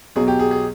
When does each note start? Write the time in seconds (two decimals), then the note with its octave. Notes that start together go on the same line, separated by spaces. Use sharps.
0.16 B1 B2 F#3 G#4
0.28 G4
0.39 G#4
0.51 G#4